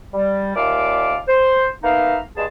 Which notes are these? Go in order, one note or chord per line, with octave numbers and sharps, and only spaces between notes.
G3
D#2 A#2 D5 E5 F5 D6
C5
A#3 B3 D#4 E5 F5
G2 G#3 G#4 A5